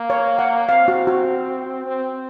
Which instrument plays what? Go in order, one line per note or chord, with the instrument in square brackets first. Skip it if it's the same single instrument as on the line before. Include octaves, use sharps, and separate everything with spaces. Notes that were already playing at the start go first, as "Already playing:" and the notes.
Already playing: [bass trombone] A#3
[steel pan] C#5
F#5
[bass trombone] C4 [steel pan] F5
[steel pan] F#4
F#4
[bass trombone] C4